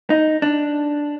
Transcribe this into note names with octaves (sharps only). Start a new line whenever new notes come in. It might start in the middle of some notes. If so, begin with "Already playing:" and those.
D#4
D4